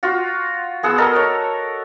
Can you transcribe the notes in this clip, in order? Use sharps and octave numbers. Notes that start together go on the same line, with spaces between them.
F4 F#4
B3 G#4 F#5 E6
A4 A#4 D#5
C#5